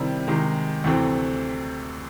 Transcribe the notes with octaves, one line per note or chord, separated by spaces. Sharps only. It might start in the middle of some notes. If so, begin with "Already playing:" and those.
Already playing: C3 D#3 G3 C4 E4
C3 D#3 G#3
D2 C3 E3 A3 C4